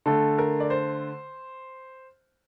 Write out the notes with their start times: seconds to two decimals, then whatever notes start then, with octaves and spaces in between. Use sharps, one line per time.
0.06 D3 A3 A4
0.39 A#4
0.60 D5
0.70 C5